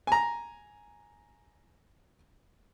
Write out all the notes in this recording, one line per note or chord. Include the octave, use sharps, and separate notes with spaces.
G#5 A#5